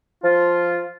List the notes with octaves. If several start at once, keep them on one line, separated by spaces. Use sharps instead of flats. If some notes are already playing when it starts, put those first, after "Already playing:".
F3 F4